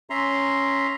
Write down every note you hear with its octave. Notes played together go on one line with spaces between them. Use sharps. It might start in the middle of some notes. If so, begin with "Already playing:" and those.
C#4 E5 A#5 C6